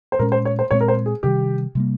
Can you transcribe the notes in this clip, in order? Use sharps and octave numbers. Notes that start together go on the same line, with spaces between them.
C5
A#2 G#3 C#4 A#4
C5
C#5
C5
A#2 G#3 C4 C#5
A#4
C5
G#4
C3 D#3 G3 G4
C3 G3 A#3